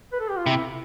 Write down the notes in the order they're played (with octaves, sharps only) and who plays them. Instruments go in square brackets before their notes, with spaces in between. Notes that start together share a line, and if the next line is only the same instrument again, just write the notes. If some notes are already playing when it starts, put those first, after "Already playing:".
[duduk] B4
A4
G4
F4
[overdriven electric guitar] C3 [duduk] E4